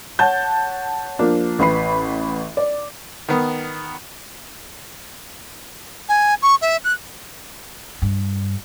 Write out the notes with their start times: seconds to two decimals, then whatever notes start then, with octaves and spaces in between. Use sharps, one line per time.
0.19 C#5 F#5 A5 G6
1.19 F3 A#3 D4
1.59 A1 B4 B5 C7
2.57 D5
3.29 D#3 B3
6.09 G#5
6.42 C#6
6.62 E5
6.84 F#6
8.02 G2